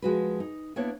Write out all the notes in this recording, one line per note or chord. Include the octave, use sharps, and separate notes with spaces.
F3 G#3 F#4 B4
D#4
A#3 B3 D4 E4 C#5